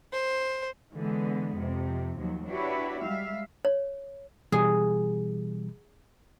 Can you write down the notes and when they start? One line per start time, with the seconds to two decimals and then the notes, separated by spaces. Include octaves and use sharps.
0.13 C5
0.93 D3 E3 G#3 B3
1.55 F2 C3
2.17 D#2 F3 F#3
2.47 D4 E4 F#4 G4 B4 C#5
3.02 G3 G#3 E5 F5
3.65 C#5
4.52 B2 E3 G3 G#4